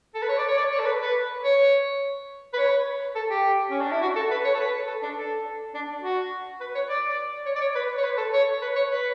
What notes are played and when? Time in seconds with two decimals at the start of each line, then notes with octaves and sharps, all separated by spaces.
0.15 A4
0.22 B4
0.28 C#5
0.38 D5
0.48 C#5
0.57 D5
0.71 C#5
0.79 A4
0.85 B4
1.01 B4
1.44 C#5
2.53 B4
2.58 C#5
3.15 A4
3.30 G4
3.70 C#4
3.81 D4
3.91 E4
4.02 F#4
4.16 A4
4.31 B4
4.44 C#5
4.54 A4
4.59 B4
4.87 A4
5.02 D4
5.16 A4
5.74 D4
6.02 F#4
6.60 B4
6.75 C#5
6.89 D5
7.08 D5
7.46 C#5
7.56 D5
7.60 C#5
7.75 B4
7.98 C#5
8.03 B4
8.17 A4
8.33 C#5
8.62 B4
8.76 C#5
8.90 B4